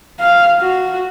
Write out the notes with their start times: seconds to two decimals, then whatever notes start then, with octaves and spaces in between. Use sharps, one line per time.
0.20 F5
0.60 F#4